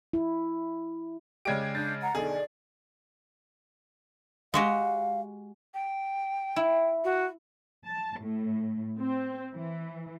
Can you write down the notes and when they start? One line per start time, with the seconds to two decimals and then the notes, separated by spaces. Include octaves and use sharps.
0.13 E4
1.45 C#3 G#3 G4 D5 G#6 D7
1.74 D4 G6 A6 C7
2.01 F#5 A#5
2.15 B1 D3 D#4 G#4 D5
4.54 G#3 F#4 G4 F5
5.74 G5
6.56 E4
7.04 F#4
7.86 A5
8.20 A2
9.01 C4
9.54 E3